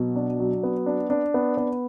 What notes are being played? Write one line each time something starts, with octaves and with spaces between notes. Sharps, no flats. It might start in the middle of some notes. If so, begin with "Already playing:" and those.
Already playing: B2 F#3
D4
F#3
B3
D4
D4
B3
B3